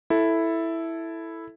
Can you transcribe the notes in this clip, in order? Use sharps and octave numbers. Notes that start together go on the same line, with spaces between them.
E4 A4